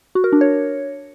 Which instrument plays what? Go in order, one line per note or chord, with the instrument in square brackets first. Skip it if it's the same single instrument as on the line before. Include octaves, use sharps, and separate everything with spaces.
[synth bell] F#4
A#4
D4
C#5